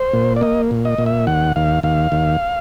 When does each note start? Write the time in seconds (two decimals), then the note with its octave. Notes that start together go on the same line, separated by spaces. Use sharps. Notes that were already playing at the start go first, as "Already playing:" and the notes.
Already playing: C5
0.13 A#2
0.36 D5
0.41 A#3 D#5
0.71 A#2
0.85 D#5
0.98 A#2
1.06 E5
1.27 D#2 F#5
1.56 D#2 F5
1.83 D#2 F5
2.12 D#2